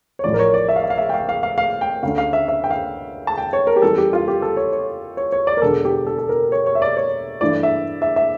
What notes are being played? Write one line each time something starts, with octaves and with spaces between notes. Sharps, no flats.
C#5
A1 A2 F3 D5
A#4
C#5
D5
E5
F5
E5
F5
E5
G5
F5
F5
F5
F5
G5
D2 D3 A3 C#4 F5
F5
E5
E5
G5
F5
A5
G5
C#5
A#4
G4
E2 E3 G3 C#4 A4
G4
F4
G4
A4
C#5
C#5
C#5
C#5
D5
A#4
E1 E2 D3 A4
G4
A4
A4
A#4
C#5
C#5
E5
D5
C#5
G2 E3 A3 D4 D5
E5
E5
E5